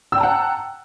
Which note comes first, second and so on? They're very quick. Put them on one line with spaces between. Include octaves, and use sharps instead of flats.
E6 G5 A#5 A5 F#5